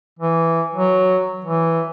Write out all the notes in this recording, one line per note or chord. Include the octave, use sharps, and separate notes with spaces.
E3
F#3
E3